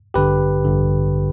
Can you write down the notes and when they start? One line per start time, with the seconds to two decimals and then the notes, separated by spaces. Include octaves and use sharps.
0.14 A1 G2 D3 G4 B4
0.65 A1 G2 D3